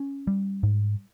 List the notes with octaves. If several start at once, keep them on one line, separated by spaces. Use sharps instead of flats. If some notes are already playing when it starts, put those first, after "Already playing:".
Already playing: C#4
G3
G#2